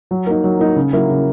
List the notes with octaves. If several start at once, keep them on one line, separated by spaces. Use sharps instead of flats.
F#3
A#3 D#4
F#3
A#3 D#4
C#3
F#3 A#3 E4
C#3